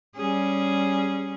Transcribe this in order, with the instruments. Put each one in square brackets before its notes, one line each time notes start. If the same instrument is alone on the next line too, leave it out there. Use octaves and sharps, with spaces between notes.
[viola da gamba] G3 C#4 G#4